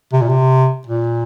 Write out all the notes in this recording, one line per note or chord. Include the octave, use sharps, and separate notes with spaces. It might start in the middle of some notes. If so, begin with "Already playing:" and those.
C3
A#2
C3
A#2